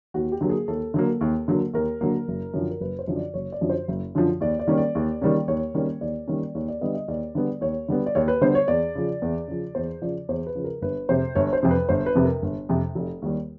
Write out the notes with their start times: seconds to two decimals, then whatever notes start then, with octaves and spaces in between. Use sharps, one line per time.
0.14 D#2 F#4
0.32 G4
0.41 D3 F#3 A#3
0.49 G#4
0.68 D#2 A4
0.94 D3 F#3 A#3
1.21 D#2
1.48 D3 F#3 A#3
1.74 D#2 A#4
2.01 D3 F#3 A#3
2.28 F#1
2.54 F#2 D3 F3
2.71 A#4
2.80 F#1 B4
2.99 C5
3.07 F#2 D3 F3
3.16 D5
3.34 F#1 C#5
3.52 D5
3.61 F#2 D3 F3
3.70 C5
3.88 F#1
4.15 F#2 D3 F3
4.41 D#2 D5
4.59 D5
4.67 D#3 G3 A#3 C#4
4.77 D5
4.95 D#2
5.22 D#3 G3 A#3 C#4
5.48 D#2 C#5
5.74 D#3 G3 A#3 C#4
6.01 D#2 D5
6.27 D#3 G3 A#3 C#4
6.55 D#2 C#5
6.68 D5
6.81 D3 G3 B3 D#5
6.94 D#5
7.08 D#2 D5
7.35 D3 G3 B3
7.61 D#2 C#5
7.88 D3 G3 B3
8.06 D5
8.15 D#2 C#5
8.28 B4
8.41 D3 G3 B3 C5
8.55 C#5
8.68 E2 D5
8.95 C#3 F3
9.22 E2
9.48 C#3 F3
9.75 E2 C5
10.02 C#3 F3 D5
10.29 E2 C5
10.47 B4
10.55 C#3 F3
10.64 A#4
10.82 G1 B4
11.09 F2 C3 C5
11.35 G1 C#5
11.53 C5
11.63 F2 C3
11.71 B4
11.89 G1 C5
12.06 B4
12.15 F2 C3
12.25 A#4
12.42 G1
12.69 F2 C3
12.95 F1
13.22 D#2 D#3 G3